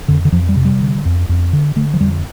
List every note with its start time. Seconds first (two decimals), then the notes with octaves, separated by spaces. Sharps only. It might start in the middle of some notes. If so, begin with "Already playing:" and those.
0.08 F2 D3
0.25 D3
0.32 F2 F3
0.49 G3
0.56 C3
0.65 G3
0.80 D3
1.05 F2
1.29 F2
1.53 D3
1.76 D3 A3
1.94 F3
2.00 F2 G3